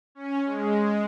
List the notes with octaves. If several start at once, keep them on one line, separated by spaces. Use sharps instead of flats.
C#4
G#3